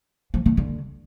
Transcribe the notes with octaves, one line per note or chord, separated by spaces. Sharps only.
F3
D#3
D3